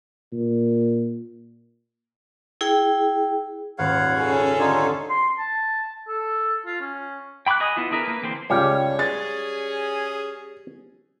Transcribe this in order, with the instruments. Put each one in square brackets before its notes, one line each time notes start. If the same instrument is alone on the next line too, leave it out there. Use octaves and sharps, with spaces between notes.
[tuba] A#2
[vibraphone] E4 G#4 G5
[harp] D#1 G#2 [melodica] C#5 F5 F#5
[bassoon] C#3 [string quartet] C#4 G#4 A4
[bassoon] D3 [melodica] D#4 F4 C#5
[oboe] C6
A5
A4
F4
C#4
[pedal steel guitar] G5 B5 C#6 D6 F#6
G#4 D#5 B5 D#6
B3 E4 F4
D4 E4 G#4 A#4 B4
A#3 B4
D3 E3 A#3 C4 C5
[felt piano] C#2 [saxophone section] G2 C#5 [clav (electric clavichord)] G3 G4 F5
[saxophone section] C#4 G#4 [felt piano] A6